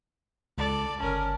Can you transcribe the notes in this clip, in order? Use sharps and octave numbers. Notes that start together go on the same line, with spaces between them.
C#2 A4 D5
G1 C#4 A#4 A5